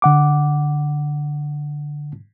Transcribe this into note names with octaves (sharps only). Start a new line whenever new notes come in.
D3 F#5 D6